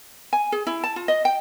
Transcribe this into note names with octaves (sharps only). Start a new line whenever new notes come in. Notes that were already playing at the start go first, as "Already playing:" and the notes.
G#5
G#4
E4
A5
F4
D#5
G5